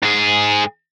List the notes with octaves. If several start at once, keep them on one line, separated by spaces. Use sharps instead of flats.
G#2 G#4